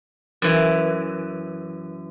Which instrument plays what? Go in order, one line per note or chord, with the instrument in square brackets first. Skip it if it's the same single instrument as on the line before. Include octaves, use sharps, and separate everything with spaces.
[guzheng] F#2 E3